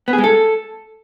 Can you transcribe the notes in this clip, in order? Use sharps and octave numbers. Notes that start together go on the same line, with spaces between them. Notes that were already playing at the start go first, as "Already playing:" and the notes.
B3
G#4
G#3
A4